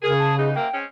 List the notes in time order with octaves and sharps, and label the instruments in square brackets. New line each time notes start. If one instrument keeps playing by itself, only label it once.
[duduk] C#3 [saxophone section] G#4 [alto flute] A#4
[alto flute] A5
[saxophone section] E3 B3 D#4 [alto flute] G#4
[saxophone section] F#2 C3 A#3 [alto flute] G5
[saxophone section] G#3 C4 C#4